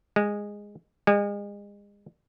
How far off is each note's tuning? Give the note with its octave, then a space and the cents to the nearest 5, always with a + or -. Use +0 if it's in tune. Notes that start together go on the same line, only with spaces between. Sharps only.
G#3 -10
G#3 -35